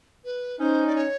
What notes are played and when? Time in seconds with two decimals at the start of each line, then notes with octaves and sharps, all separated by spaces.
0.24 B4
0.59 C#4 D#4 C5
0.87 D5
0.96 C#5